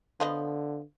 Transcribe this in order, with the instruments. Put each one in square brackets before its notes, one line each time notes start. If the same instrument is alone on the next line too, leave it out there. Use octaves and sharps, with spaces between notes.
[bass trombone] D3 [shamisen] F3 B3 D#5